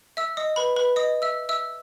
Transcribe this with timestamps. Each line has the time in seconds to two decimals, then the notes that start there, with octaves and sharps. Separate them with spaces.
0.17 E5 E6
0.37 D#5 D#6
0.56 B4 B5
0.76 B4 B5
0.96 D#5 D#6
1.22 E5 E6
1.49 E5 E6